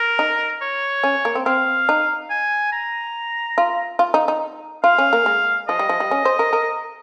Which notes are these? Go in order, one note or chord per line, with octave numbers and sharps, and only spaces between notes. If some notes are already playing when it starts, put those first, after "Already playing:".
Already playing: A#4
D#4
C#5
C#4
A#3
C4
C4 F5
D#4
G#5
A#5
F4
F4
D#4
D#4
F4 F5
C#4
A#3
G#3
F3 D#5
G3
F3
G3
C#4
C5
A#4
A#4